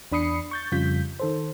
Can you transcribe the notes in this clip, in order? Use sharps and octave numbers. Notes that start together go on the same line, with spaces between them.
E2 D4 B5 D#6 C7 C#7
C#6 G6 A6
F2 C#3 G3 F4 G6 B6
D#3 A4 C5